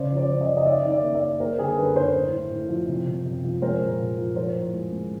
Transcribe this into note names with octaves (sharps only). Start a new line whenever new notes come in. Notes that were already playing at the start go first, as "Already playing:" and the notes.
Already playing: C#3 C5 D5
F3
C5 D5
C#3
D#5
C#3 D5
C#5 D#5
D#3 D5 E5
D#3
D5 E5
A#3
D5 E5
A#3
A#3 A#4 C5
D3 G#4 A#4
D3 A4 B4
D3 A#4 C5
A2
A2
A2
F3
C3
C3
C3
F3
G#3 A#4 C5
A#2
A#2
F3
F3 A#4 C5
A2
G#3
G#3